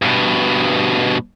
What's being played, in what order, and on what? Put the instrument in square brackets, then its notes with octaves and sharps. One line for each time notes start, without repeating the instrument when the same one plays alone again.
[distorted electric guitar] G2 B2